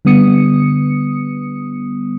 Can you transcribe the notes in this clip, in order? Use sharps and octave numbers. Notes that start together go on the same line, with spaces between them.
D3 G3 B3 D#6 C#7